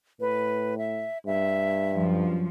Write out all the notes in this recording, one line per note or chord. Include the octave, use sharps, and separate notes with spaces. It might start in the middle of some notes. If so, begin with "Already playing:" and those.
A2 B4
E5
G2 E5
F#2 F3